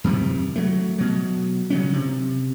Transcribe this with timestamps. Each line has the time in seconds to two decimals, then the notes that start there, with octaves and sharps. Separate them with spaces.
0.04 F#2 C3 D#3 E3
0.56 F#3 A3
0.98 B2 F#3
1.70 C#3 F#3 C#4
1.93 C3